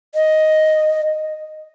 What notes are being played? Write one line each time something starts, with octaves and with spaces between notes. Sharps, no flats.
D#5